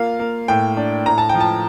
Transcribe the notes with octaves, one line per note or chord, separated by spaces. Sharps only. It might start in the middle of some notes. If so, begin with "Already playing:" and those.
Already playing: A#3 F4 F5
A#3
A2 G5
D4
A2 A#5
A5
G5
F3
A5